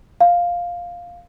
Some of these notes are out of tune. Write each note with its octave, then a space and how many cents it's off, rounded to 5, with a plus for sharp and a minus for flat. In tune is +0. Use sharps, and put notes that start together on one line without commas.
F5 +5